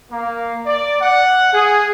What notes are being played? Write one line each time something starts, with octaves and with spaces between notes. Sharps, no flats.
A#3
D5
F#5
G#4